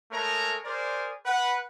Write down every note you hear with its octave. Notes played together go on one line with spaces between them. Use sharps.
G#3 A3 A4 A#4 C#5 A#5
G#4 A#4 C5 D5
B4 F#5